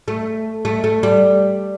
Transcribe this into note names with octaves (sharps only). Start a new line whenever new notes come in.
A3
A3
A3
G3